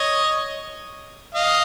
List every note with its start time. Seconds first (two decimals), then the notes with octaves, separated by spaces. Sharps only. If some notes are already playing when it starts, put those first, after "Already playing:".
Already playing: C#5 D#5
1.35 D#5 F5